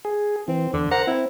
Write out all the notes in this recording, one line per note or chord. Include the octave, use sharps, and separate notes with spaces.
G#4
E3 C4
E2 D3
A#4 C5 F#5 A#5
C4 E4